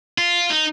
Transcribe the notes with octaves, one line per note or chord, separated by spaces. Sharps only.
F4
D#4